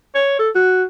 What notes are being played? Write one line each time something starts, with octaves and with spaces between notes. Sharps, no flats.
C#5
A4
F#4